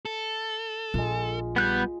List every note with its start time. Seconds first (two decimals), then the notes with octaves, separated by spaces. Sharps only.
0.05 A4
0.94 A#1 G#3 F4
1.56 G3 B3 F#6 G6